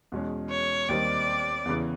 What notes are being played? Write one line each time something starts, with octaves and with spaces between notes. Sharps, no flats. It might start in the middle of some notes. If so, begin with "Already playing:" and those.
E2 B2 G#3 C#4
C#5
D#2 D#3 G3 C4 D#4 D5
E2 C#3 E3